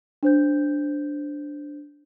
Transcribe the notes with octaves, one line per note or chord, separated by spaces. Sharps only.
D4 C5 G6